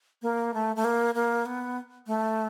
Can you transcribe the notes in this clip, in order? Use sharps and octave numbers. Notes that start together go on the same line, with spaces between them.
A#3
A3
A3
A#3
A#3
B3
A3